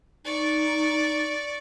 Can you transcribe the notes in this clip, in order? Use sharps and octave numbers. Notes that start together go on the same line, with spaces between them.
D#4 D5 C#6